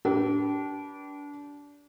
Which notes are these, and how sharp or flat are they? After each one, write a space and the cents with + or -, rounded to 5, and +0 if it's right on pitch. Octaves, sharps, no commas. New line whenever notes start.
D4 -25 G4 -30 B4 -35